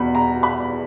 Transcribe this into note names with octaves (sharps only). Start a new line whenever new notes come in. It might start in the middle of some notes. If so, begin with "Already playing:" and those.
Already playing: E2 B2 B5
A#5
B5